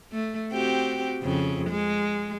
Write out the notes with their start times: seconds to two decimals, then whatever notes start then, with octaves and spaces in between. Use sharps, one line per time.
0.12 A3
0.53 C4 F#4 G4
1.23 F2 C#3
1.70 G#3